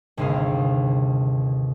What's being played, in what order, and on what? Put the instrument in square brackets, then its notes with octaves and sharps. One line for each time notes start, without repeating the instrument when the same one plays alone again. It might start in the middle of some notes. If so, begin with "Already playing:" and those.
[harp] G1 D#2 C3 G#4 F5